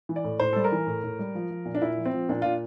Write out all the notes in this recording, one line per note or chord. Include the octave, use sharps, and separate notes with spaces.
E3
D5
A2
A2 C5
G3 A4
A#4
E3
A2
A2
G3
F3
F3
A#2
D4
A#2 E4
F3
C4
F3
A#2 D4
A#2 F4